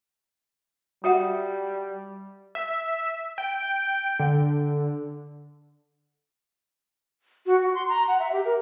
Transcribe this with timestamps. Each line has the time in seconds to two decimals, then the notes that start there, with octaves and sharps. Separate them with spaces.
1.04 G3 F#4 E5 F#5
2.55 E5
3.38 G5
4.19 D3
7.46 F#4
7.60 F#4
7.75 C6
7.89 A#5
8.08 F#5
8.20 E5
8.33 G4
8.45 A#4